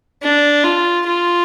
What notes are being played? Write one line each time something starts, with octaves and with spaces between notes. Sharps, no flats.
D4
F4
F4